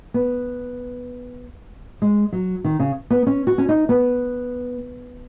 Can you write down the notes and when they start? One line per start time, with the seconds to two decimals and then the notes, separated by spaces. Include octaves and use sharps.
0.14 B3
2.02 G#3
2.32 F#3
2.64 D#3
2.79 C#3
3.10 B3
3.27 C#4
3.47 F#4
3.58 C#4
3.69 D#4
3.89 B3